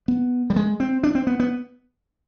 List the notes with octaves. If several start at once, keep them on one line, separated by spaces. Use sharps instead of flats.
B3
G3
G#3
C4
D4
C4
B3
B3